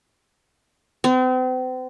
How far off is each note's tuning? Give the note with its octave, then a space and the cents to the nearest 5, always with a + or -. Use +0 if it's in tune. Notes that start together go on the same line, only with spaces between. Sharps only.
C4 -40